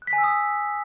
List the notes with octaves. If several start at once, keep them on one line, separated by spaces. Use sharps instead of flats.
F#6
B6
G#5
E6
D#6